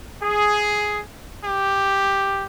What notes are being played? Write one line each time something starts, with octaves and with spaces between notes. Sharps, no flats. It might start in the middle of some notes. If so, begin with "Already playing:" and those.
G#4
G4